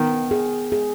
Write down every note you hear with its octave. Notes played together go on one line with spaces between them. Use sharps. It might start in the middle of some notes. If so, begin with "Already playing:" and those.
Already playing: D#3 B3
G#4
G#4